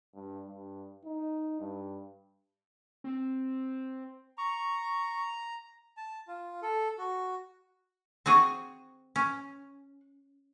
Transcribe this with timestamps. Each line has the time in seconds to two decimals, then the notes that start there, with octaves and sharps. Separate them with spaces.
0.14 G2
0.47 G2
1.05 D#4
1.60 G2
3.04 C4
4.38 A#5 C#6
5.97 A5
6.28 F4
6.62 A4
6.98 F#4
8.26 C4 F#4 G#4 C5 F#5 C#6
9.16 C#4